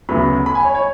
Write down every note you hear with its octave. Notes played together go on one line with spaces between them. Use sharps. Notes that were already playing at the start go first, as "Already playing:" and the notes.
D2 C#3 F#3 B3 B5
B5
G#5
C#5
C#5